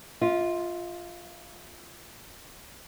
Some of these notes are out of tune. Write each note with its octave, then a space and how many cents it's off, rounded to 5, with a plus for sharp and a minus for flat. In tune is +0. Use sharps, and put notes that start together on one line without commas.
F4 +0 E5 -45